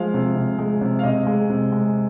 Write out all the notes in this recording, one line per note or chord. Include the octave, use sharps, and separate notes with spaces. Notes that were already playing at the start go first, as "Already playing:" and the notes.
Already playing: F3 G#3 F5
C3
C3
G#3
C3
F5
C3 D#5
G#3
C3
G#3